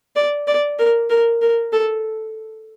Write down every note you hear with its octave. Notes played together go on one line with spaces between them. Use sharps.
D5
D5
A#4
A#4
A#4
A4